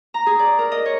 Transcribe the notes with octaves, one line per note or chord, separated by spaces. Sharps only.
A#5
G#4
D5
A#4
D#5
C#5